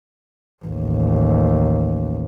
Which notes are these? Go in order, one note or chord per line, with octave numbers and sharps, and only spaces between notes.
A1 D#2